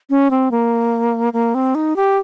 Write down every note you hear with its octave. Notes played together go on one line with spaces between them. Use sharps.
C#4
C4
A#3
A#3
C4
D#4
G4